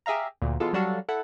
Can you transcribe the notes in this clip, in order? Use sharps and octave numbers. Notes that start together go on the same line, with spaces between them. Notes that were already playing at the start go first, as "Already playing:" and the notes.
G4 G#4 E5 F5 A#5
D2 A#2
B2 E3 G#3 F4 A4
F#3 G3 D4 F#4 A4 F5
E4 A4 F#5